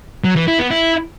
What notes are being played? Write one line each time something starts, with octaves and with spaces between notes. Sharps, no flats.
F#3
E3
E4
B3
E4